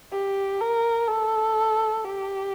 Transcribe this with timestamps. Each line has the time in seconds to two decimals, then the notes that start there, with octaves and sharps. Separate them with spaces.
0.13 G4
0.61 A#4
1.08 A4
2.04 G4